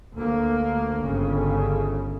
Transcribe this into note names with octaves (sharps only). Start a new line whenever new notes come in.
D2 A#3
G1 C#3